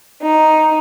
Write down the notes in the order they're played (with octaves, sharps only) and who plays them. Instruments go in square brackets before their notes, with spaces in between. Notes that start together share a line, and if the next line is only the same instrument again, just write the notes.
[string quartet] D#4